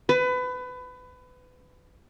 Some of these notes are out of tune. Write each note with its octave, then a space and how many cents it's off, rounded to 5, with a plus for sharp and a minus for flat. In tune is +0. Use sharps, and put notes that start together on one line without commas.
B4 +25